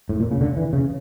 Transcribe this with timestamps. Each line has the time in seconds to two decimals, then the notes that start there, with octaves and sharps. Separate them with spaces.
0.09 A2
0.20 A#2
0.31 C#3
0.41 D3
0.57 E3
0.73 C#3